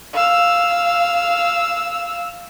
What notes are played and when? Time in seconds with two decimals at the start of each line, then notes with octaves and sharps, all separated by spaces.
0.13 F5 E6